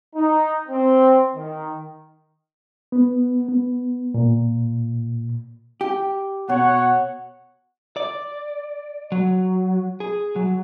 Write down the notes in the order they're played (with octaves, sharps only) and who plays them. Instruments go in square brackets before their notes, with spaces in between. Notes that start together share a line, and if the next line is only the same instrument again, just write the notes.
[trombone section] D#4
C4
D#3
[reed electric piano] B3
B3
A#2
[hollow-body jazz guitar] G4
[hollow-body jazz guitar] B2 [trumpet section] C#5 F#5
[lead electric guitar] D5
F#3
G#4
F#3